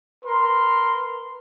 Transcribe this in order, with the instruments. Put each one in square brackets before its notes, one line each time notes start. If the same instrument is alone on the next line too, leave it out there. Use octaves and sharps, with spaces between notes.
[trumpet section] A#4 C6 [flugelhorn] B4